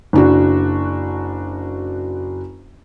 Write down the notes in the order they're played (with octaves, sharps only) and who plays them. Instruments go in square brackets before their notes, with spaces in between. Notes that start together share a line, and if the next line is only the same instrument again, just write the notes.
[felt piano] F#1 D4 F#4